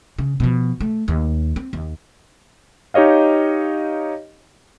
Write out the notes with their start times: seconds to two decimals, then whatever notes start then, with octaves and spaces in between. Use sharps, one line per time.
0.18 C#3
0.40 B2 F3
0.80 A3
1.08 D#2
1.56 C4
1.73 D#2
2.94 D#4 G4 C#5 D#5 F5